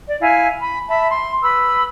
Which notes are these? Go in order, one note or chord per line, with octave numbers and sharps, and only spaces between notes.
D5
E4 F5 G#5
B5
E5 A5 B5
C6
B4 B5 E6